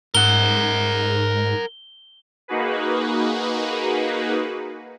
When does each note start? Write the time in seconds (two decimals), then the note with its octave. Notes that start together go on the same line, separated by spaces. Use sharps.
0.15 G#2 A#4 F#5 G7
2.48 A#3 D#4 F#4 G#4 B4